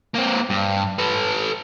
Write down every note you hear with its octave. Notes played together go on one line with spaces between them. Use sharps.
A#3 C4
G2
A4 B4